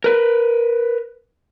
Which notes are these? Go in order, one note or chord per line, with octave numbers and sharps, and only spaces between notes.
A#4 B4